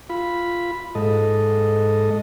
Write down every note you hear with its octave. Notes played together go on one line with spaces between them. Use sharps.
F4 B5
G#2 A4 D#5